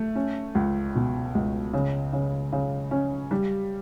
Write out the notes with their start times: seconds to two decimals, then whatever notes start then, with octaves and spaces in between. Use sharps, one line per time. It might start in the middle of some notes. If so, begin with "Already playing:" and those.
Already playing: A3
0.15 C#4
0.55 C#2
0.95 B2
1.35 C#2
1.73 C#3
2.13 C#3
2.52 C#3
2.91 C#4
3.31 G3